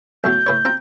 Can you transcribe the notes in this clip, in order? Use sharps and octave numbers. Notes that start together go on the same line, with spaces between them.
B1 A2 F#3 G6
A2 B4 C#5
C4 F4 A#5